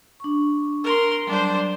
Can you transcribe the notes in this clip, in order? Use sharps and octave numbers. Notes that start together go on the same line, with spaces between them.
D4 C#6
A#4 C6
F#3 G3 D4 C5